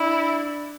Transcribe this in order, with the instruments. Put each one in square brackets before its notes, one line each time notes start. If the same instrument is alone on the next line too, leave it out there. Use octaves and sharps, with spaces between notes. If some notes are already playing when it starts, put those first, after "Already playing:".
Already playing: [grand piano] D4 [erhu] E4